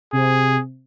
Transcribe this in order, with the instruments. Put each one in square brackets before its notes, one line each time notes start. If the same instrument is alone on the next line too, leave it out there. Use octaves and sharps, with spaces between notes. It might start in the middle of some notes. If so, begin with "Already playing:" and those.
[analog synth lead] C3 [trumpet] G#4